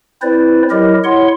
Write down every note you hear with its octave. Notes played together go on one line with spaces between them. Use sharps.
C4 E4 B4 C5 D5
F#3 E4 G4 A#4 D#5
E4 C#5 F#5 C6